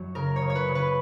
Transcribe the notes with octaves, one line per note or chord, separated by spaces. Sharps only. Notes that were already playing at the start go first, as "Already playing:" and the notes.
Already playing: F#2 F#3 C#5
C#3 A#4
C#5
C#3
C#5
B4
C#3
B4